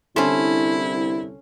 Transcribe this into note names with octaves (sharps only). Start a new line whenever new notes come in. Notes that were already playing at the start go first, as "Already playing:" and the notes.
C2 D3 C#4 E4 A4 C6